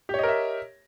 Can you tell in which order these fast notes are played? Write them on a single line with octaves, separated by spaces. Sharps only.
G4 C#5 D#5 A#4 E5